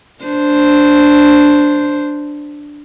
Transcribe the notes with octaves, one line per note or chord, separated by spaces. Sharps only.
D4 C5